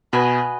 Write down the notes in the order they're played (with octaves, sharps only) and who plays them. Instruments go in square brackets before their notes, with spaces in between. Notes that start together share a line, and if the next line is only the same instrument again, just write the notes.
[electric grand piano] B2 [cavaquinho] F#4 B4 D#5 G#5